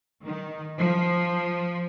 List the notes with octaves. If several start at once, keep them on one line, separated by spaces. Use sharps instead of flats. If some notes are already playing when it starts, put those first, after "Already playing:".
D#3
F3